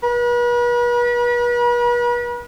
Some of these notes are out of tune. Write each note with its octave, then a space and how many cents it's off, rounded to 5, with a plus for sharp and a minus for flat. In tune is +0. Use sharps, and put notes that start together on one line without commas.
B4 -40